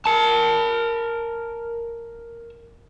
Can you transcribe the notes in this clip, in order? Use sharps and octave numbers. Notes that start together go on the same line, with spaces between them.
A#4 A5